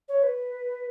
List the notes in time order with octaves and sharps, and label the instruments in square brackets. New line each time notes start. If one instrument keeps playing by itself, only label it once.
[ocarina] C#5
B4